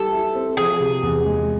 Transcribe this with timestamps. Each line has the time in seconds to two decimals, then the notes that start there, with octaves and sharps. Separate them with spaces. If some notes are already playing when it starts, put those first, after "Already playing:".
Already playing: G3 E4 G4 A4
0.13 E4
0.35 C4
0.57 F3 G#4
0.80 C3
1.03 E2
1.26 G#3